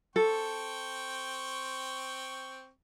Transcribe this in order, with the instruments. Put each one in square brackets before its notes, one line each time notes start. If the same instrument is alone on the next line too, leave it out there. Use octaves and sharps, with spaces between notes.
[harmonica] C4 G5 C#6 [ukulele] A4